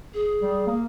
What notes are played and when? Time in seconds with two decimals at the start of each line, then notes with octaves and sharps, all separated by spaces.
0.14 G#4
0.42 G3
0.66 A#3